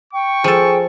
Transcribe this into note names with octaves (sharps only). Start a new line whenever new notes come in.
G5 C#6
F3 G#4 A4